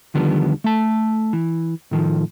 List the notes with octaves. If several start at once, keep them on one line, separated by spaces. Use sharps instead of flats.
D2 D3 D#3 F3 G3 B3
A3 A5
E3
A2 D#3 F3